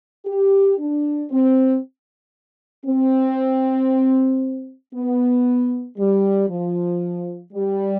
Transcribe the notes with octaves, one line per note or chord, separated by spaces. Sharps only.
G4
D4
C4
C4
B3
G3
F3
G3